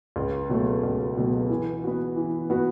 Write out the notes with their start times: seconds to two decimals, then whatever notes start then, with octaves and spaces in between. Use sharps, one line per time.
0.16 C#2
0.49 B2 F#3 A3
0.83 C#2
1.17 B2 F#3 A3
1.50 E3
1.84 B3 F#4
2.16 E3
2.50 B3 F#4